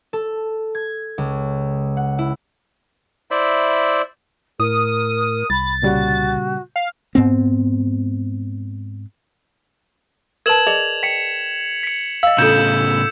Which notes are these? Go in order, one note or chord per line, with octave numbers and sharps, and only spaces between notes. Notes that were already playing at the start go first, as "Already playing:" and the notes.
A4
G#6
C#2
F#5
E4
E4 C5 D5 E5 B5
A2 A#4 D#6
C2 B5 A6
A#2 C#3 G3 F#4
F5
G#2 B3 C4
A#4 B4 A5 G#6 E7 F#7
G#4 D5 D#5 F7
G5 B6 C#7
B6 C#7
D#5 F5 E6
A2 C#3 D4 F4 A4 G6 C#7 E7